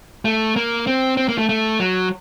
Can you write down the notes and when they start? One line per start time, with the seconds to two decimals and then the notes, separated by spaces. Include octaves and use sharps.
0.25 A3
0.56 A#3
0.87 C4
1.17 C4
1.29 A#3
1.38 A3
1.49 A3
1.80 F#3